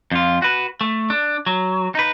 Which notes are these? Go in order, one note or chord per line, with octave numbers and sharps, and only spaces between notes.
F2 F4
F#4 B4
A3
D4
F#3
D#4 B4